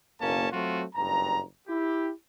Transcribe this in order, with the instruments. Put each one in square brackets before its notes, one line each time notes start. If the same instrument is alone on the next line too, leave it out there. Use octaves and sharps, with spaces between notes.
[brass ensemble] F#1 B1 A#3 C#4 A5
F#3 A3 C4 F4 F#4
F#1 G2 A#5
E4 G4